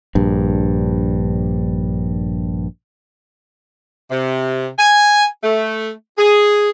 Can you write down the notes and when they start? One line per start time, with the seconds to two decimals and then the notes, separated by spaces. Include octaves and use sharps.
0.15 A#1 G2
4.11 C3
4.78 G#5
5.43 A3
6.18 G#4